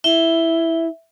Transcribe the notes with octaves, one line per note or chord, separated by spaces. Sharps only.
E4 E5 G7